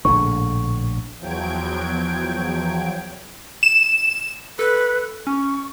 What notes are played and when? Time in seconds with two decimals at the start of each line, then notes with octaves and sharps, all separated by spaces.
0.05 A#1 A2 D3 C#6
1.20 E2 F3 F#3 G5 G#6 D7
3.63 E7
4.59 A4 B4
5.27 C#4 C#6